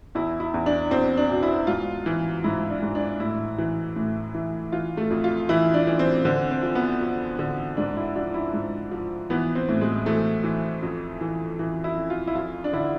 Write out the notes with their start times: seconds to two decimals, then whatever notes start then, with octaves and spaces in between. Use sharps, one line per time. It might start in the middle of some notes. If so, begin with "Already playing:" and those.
0.15 E2 E4
0.40 E4
0.54 E2
0.66 D4
0.91 E2 C4
1.17 D4
1.30 B2
1.43 E4
1.67 G#2 F4
2.06 E3
2.44 G#2 E4
2.70 D4
2.83 G#2
2.95 D4
3.20 A2 E4
3.58 E3
3.96 A2
4.34 E3
4.72 E3 F4
4.97 A3
5.11 F2
5.24 F4
5.49 E3 E4
5.74 D4
5.87 E3
5.99 C4
6.25 D3 C4
6.51 C4
6.63 F3
6.75 B3
7.01 F2
7.39 D3
7.77 G#2 D4
7.97 E4
8.16 F3 D4
8.34 E4
8.54 G#2
8.91 F3
9.30 E3 B3
9.55 C4
9.69 A2
9.81 G#3
10.06 E3 A3
10.44 E3
10.83 F2
11.21 E3
11.59 E3
11.84 E4
11.96 F2
12.10 F4
12.27 E4
12.35 F2 F4
12.64 D4
12.73 D3 E4